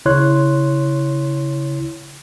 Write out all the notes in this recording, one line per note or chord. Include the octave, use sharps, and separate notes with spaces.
C#3 E4 C#5 C6 F#6